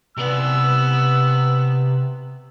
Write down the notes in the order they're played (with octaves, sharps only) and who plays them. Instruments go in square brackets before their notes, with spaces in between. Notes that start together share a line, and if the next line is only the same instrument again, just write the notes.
[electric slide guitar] C3 D5 [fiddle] B3 [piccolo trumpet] E6